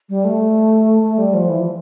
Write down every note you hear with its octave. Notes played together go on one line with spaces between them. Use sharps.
G3
A3
A3
G3
F3
E3
F3